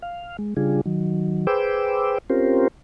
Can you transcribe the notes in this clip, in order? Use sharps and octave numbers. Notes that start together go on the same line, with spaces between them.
F5
G#3
C#3 G3 D4 F4 G#4
D#3 F#3
G#4 B4 C5 G5 D6 E6
C4 C#4 F4 G4 A#4 C5